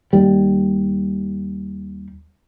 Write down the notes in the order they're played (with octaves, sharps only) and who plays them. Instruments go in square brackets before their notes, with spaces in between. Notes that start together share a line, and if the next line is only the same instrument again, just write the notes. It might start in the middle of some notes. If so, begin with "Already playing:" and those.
[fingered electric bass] D#2 G3